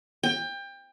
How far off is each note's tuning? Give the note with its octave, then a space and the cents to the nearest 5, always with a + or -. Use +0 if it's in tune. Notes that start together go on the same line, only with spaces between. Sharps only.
G5 +25